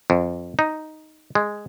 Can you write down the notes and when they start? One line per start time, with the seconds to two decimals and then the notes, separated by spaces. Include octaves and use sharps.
0.10 F2
0.59 D#4
1.35 G#3